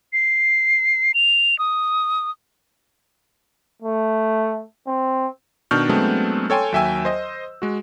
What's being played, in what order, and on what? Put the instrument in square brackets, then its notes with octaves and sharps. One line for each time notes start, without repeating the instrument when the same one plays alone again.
[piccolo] C7
F7
D#6
[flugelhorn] A3
C4
[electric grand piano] B2 D#3 D4 C#6 F6 G6
F#3 G#3 A3 B3 C4 D4
A4 C#5 G5 G#5 C6
D#2 F#3 E5 G5 G#5 E6
C5 D#5
G#3 F#4